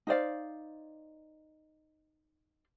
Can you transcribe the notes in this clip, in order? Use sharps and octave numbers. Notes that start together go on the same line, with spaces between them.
D#4 C5 D5 F5